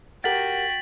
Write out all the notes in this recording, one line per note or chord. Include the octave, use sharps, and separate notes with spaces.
F#4 G4 A#4 F#5 G5 A6 B6 F#7